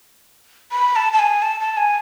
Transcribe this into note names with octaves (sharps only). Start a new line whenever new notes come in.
B5
A5
A5
G#5
A5
A5
G#5